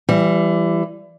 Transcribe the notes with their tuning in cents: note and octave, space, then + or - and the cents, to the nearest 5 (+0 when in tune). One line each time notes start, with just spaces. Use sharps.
E3 +25 G3 +0